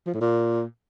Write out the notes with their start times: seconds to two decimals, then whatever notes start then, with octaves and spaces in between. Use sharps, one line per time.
0.06 F3
0.14 A2
0.21 A#2